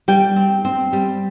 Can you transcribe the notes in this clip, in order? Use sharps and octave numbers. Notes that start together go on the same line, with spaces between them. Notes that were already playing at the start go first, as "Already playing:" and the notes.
G3 G5
C4
C4
G3